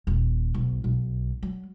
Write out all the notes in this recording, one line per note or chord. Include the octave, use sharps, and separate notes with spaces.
D#1
B1
B1
F#3